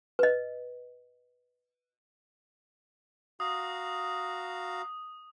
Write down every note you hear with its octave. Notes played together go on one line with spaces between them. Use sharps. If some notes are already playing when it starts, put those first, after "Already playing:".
B4 D#5
F#4 F5 A#5 D#6